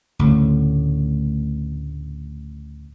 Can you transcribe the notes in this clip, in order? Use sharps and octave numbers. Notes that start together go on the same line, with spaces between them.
D2 A2 C#3